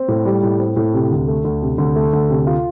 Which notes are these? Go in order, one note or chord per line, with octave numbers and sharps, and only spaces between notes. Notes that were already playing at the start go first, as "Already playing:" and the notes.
Already playing: C4
A2
G3
A2
C4
A2
C3
D2
A3
D2
C3
D2
A3
D2
C3
F4